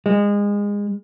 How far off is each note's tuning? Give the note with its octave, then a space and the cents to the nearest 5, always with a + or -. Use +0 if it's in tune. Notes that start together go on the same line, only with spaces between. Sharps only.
G#3 -25